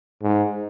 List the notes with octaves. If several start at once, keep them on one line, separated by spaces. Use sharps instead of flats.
G#2